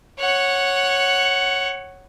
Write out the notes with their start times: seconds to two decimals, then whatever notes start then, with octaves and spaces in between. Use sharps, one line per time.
0.19 C#5 F#5